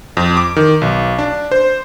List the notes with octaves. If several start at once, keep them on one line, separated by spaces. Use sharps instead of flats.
F2
D6
D#3
B1
D4
C5